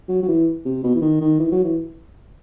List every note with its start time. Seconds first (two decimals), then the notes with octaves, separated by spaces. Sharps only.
0.08 F#3
0.23 F#3
0.28 E3
0.65 C3
0.83 B2
0.95 E3
1.02 D#3
1.21 D#3
1.39 E3
1.52 F#3
1.64 E3